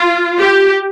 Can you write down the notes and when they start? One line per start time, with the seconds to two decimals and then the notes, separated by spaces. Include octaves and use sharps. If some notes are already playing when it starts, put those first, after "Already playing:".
Already playing: F4
0.38 G4